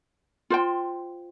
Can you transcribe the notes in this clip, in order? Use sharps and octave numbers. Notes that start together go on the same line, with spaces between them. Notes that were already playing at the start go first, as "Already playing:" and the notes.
F4 C5 G5